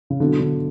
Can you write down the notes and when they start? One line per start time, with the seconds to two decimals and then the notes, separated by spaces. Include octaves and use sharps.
0.10 C#3
0.20 B2 D3 F#3 B3 E4
0.40 D3